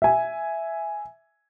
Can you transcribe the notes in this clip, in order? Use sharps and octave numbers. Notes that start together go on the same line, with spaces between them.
E5 G#5